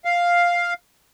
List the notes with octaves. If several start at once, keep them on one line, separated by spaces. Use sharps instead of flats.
F5